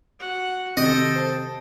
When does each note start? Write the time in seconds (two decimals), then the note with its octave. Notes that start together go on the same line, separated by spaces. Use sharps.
0.19 F#4 F#5
0.77 C3 D#3 C4 A4 D#5 G5
1.16 C5 A5